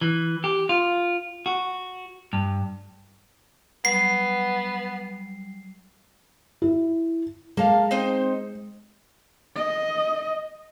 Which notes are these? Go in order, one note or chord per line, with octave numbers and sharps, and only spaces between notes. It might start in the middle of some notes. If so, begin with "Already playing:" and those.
E3
G4
F4
F#4
G2
F#3 G3 B3 C7
E4
G#3 A#3 A4 F5
C4 D#4 C5
D#5